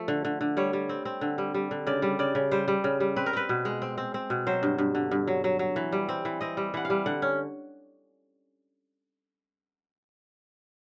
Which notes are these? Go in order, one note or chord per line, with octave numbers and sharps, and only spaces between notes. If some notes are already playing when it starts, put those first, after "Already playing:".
Already playing: F3 A3
D3
D3
D3
G3 C#5
G3
C4
C4
D3
G3
G3
D3
C#3 D5
G3
C#3 D5
C#3
G3 C5
G3
C#3
G3
C4 B4
A#4
C4 B4
B2
G#3
C4
C4
C4
B2
F#3 C5
G2
G2
D3
G2
F#3
F#3
F#3
E3
G3
C4
E3
C4 D#5
G3
E3 F#5
F5
G3
D3 F#5
C#4